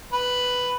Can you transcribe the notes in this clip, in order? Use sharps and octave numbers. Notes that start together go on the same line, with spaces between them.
B4